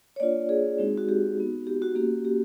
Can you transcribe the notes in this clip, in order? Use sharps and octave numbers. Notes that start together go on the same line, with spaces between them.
C#5
A#3 D4 F4 D5
G#4
G#3 C4 D#4 F#4
F#4
G4
B3 D#4 F#4
G4
F#4
A#3 C#4 F#4 G4
G4